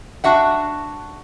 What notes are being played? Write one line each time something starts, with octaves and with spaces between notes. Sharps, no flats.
D4 F#4 E5 F#5